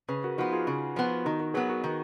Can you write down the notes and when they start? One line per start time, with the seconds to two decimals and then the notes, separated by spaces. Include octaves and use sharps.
0.08 C#3 G#4 B4
0.24 F#4 A#4
0.37 F3 B3 D#4 F#4
0.52 F4 G#4
0.67 C#3
0.96 F3 B3
1.25 D#3 D#4 F#4
1.40 F#4 A#4
1.54 F#3 B3 G#4 B4
1.69 F#4 A#4
1.84 D#3